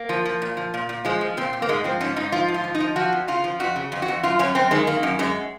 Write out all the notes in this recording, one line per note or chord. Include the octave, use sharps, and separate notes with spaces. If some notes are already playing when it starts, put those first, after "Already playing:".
Already playing: A#3
F3
F3
A#2
F3
A#2
A#2
F3 G#3
F3
A#2 C4
A#2
A#3
G#2 G#3
F3 C4
G#2 C#4
G#2 D#4
F3 F4
G#2
F4
F3
D#4
F3
F3 F#4
F2
C#3 F4
F3
F2 F#4
C#3
F2
F#4
F2
F#2 F4
F#2 C#4
F#2 C4
D#3 G#3
D#3 A#3
F#2
F#2 G#3